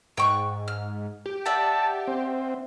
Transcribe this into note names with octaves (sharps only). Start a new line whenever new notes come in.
G#2 G5 C#6 F#6
F6
G4
D5 E5 F#5 A5
C4